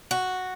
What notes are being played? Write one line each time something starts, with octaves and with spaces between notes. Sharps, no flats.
F#4